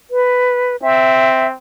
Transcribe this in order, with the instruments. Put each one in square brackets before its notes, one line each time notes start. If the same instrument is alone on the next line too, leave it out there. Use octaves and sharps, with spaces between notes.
[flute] B4
[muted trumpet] C4 [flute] E5